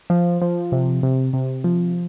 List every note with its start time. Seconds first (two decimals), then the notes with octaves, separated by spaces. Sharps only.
0.10 F3
0.42 F3
0.72 C3
1.03 C3
1.33 C3
1.64 F3